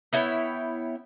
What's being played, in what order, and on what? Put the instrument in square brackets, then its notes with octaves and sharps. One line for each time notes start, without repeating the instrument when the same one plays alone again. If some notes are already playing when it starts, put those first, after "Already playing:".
[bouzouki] B3 E4 C#5 G5